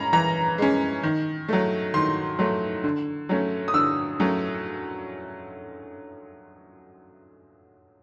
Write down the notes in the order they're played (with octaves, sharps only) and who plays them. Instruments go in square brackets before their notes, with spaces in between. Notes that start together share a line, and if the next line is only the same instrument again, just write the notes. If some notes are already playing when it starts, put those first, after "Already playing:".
Already playing: [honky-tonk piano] G#3 C#4 A#5 B5
E3 A#5
G#3 C#4
D#3
F#3 A3
D#3 C6
F#3 A3
D3
F#3 A3 C#4
D#6
D3 E6
F#3 A3 C#4